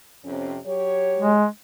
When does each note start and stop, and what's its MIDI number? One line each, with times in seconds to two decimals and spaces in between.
0.24 0.58 41
0.24 0.58 48
0.24 0.58 61
0.65 1.33 54
0.65 1.33 67
0.65 1.33 73
1.19 1.46 56